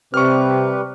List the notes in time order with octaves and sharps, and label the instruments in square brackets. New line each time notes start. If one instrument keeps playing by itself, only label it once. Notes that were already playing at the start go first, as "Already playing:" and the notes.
[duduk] C3 [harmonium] G3 G4 B4 [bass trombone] C4 [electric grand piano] C#6 F6